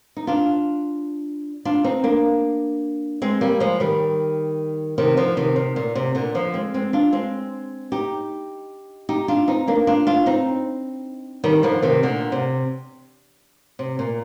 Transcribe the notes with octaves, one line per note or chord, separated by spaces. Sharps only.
D#4
D4 F4
D4 F4
C4 D#4
A#3 D4
G#3 C4
G3 A#3
F3 G#3
D#3 G3
C3 D#3
D3 F3
C3 D#3
C3
A#2
C3
A#2 D3
D3 F3
G#3 C4
G#3 C4
D4 F4
G#3 C4
D#4 G4
D#4 G4
D4 F4
C4 D#4
A#3 D4
D4 F4
D4 F4
C4 D#4
D#3 G3
D3 F3
C3 D#3
A#2 D3
C3
C3
A#2